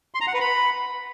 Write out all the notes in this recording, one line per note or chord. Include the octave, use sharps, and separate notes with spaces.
C6
A#5
F#5
B4
B5